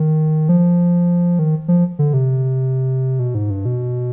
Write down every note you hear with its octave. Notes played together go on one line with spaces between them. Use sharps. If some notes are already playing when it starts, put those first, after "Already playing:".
Already playing: D#3
F3
D#3
F3
D3
C3
B2
G#2
G2
B2